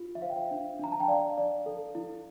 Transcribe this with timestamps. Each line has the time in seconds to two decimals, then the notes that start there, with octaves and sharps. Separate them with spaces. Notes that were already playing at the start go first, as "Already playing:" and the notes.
Already playing: F4
0.15 E5
0.22 C5 F5
0.30 G5
0.37 F5
0.51 D4
0.79 D4 A#5
0.92 A5
1.00 G5
1.08 D5 F5
1.38 D5
1.66 A4
1.95 E4